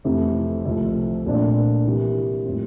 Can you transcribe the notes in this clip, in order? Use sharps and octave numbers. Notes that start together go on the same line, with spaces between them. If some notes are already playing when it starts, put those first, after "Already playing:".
F2 C3 E3 A3
C2 C3 F3 A3
C2 A#2 A3 D4 F4
C3 E3 G3 A#3
A2 F3 C4